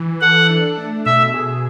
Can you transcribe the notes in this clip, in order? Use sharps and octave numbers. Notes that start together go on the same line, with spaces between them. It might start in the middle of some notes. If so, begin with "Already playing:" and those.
Already playing: E3
A4 F#5
D4
A3
B2 E5
G#4